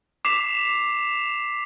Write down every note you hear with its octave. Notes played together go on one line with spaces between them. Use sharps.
D6 B6 C7 E7 F7